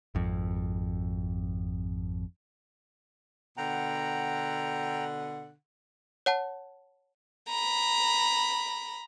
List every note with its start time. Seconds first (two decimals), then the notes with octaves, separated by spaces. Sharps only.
0.15 G#1 F2
3.57 B2 D3 F#5 G5 A#5
6.26 C#5 F#5 A5
7.48 A#5 B5